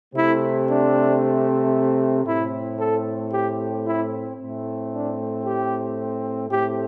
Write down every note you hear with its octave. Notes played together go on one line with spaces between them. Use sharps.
C3 A3 C4 E4
D4
A2 A3 C4 E4
A4
G4
E4
A2 A3 C4
D4
G4
A2 A3 C4 G4